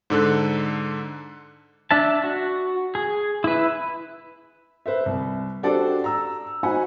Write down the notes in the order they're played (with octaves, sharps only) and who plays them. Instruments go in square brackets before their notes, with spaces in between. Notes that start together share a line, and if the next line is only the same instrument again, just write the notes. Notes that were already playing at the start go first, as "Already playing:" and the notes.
[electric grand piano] G#2 D3 A4 F#6
[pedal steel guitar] D4 E5 A5
F#4
G#4
E4 B4
[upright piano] B4 C5 E5
C2
D4 F#4 G4 A4 C5 D5
A#5 E6
D#4 F#4 C5 F#5 G#5 B5